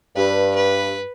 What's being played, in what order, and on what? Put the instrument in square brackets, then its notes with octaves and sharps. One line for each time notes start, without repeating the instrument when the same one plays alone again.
[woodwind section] G2 [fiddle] B4
[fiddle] B4